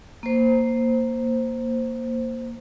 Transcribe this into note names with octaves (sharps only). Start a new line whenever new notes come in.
A#3 C5